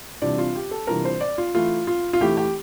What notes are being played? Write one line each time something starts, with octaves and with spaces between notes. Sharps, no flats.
C3 E3 G3 D4 F4 D5
F4
G4
A4
C3 E3 G3 D4 F4 A#4
C5
D5
F4
E3 A3 E4 F4
F4
F4
E3 A3 E4 G4
G4